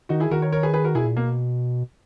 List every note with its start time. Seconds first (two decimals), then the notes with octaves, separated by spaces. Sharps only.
0.09 D#3 D#4 F#4
0.20 E4 G#4
0.31 D#3 F#4 A#4
0.42 A#4 C#5
0.52 A#4 C#5
0.63 G#4 B4
0.74 G#4 B4
0.85 F#4 A#4
0.95 B2 E4 G#4
1.05 A#2
1.15 B2 A#3